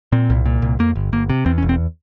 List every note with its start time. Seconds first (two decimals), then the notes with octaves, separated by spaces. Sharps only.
0.12 A#2 C4
0.30 C2
0.46 A#2
0.62 C2
0.79 F2 A#3
0.95 G1
1.13 G1 A#3
1.30 C3
1.46 E2 C4
1.58 C#4
1.62 E1
1.69 C4